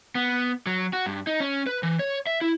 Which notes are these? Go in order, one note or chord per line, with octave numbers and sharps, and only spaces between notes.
B3
F#3
F#4
G2
D#4
C#4
B4
E3
C#5
E5
E4